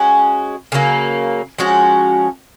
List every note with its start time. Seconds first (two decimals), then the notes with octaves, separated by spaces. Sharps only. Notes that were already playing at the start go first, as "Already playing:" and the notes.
Already playing: G#3 C#4 F#4
0.72 C#3 F#3 A#3
1.58 F3 G#3 C#4 F#4